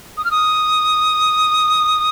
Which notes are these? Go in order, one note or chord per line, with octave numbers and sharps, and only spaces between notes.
D#6
F6
D#6